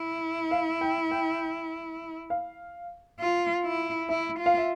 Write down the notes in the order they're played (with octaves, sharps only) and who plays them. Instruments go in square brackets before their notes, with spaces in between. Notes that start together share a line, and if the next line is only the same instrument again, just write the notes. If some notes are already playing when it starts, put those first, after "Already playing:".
Already playing: [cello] E4
[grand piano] F5
G5
G5
F5
[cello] F4
E4
[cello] E4 [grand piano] E5
[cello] F4
[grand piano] F5
E5